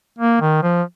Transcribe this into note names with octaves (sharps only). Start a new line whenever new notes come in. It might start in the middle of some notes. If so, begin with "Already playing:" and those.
A#3
D#3
F3